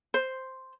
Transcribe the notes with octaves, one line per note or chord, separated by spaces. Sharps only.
C5